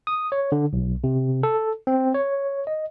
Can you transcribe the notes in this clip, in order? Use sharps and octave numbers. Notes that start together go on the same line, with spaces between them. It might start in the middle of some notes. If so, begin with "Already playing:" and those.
D#6
C#5
D3
B1
C3
A4
C4
C#5
D#5